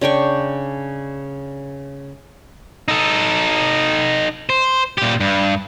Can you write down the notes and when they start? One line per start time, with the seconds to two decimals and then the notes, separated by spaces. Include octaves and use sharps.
0.01 C#3 D4 G5 C#6
2.88 D#4 A4
4.50 C5
4.98 A#2 G4
5.20 G2